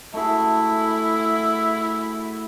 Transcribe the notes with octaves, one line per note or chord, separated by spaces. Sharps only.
A3 E4 F#4 G#4